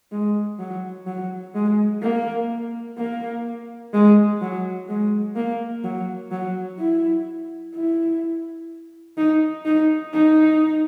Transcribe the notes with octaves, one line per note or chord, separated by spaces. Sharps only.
G#3
F#3
F#3
G#3
A#3
A#3
G#3
F#3
G#3
A#3
F#3
F#3
E4
E4
D#4
D#4
D#4